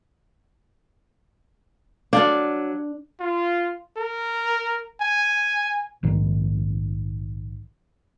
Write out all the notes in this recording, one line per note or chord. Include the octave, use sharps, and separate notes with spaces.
F#3 D4 D5 F5
F4
A#4
G#5
A#1 G#2 D#3